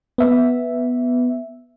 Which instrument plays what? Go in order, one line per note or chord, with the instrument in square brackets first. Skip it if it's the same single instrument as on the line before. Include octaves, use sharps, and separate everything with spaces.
[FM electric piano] B3 E5